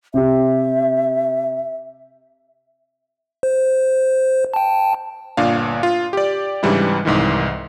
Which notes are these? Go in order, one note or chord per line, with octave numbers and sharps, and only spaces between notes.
C3 G4 E5
C5
G5 A5
G1 A#2 D4 F5
F4
G4 D5
G#2 C#3 E3 G3 D4 E4
C2 G#2 D#3 E3